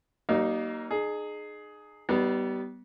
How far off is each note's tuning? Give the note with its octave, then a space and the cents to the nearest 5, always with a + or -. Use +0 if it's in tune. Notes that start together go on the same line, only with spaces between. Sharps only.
G3 -45 A#3 +10 D#4 +0
D#4 -35 G#4 +15
G3 -30 B3 +0 D#4 +0